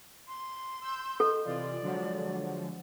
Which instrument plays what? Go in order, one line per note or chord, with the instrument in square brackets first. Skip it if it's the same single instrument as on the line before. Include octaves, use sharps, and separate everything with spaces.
[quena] C6
[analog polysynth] E6 G6
[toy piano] A4 [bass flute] D#5
[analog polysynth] C3 E3 F4 [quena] D5
[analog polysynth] D3 F3 G#3 [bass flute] F#3